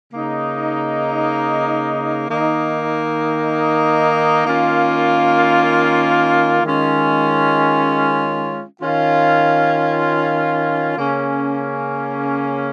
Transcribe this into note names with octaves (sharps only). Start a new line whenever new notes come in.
C#3 A#3 D#4
D#3 A#3 D#4
D#3 A#3 C#4 F4
D#3 G#3 C#4 F4
D#3 C#4 F4
C#3 A#3 C#4